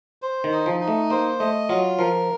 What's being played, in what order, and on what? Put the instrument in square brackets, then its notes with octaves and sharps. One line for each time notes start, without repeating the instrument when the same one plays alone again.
[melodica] C5
[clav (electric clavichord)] D#3
[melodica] D#4
[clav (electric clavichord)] F3
[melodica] D#4
[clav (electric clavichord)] A3
[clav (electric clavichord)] A#3 [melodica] C5
[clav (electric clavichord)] A3 [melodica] D#5
[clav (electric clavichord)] F#3 [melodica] F4
[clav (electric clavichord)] F3 [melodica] A#4